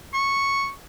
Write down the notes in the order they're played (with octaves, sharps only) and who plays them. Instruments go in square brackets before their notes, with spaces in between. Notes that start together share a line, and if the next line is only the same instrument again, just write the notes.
[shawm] C#6